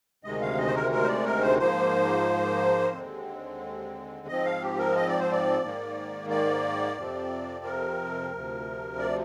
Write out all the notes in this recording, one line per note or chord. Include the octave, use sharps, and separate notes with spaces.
D2 C3 D#3 G#3 D#5
F5
D#5
C5
A#4
A#4
C5
D5
A#4
C5
G#2 F3 A#3 C5
D#2 D3 G#3 C4
G#2 F3 C4 D#5
F5
G4
A#4
D#5
D5
C5
D5
G#2 D#3 A#3
D5
F2 C3 F3 C4
A#4
D2 C3 F3
D5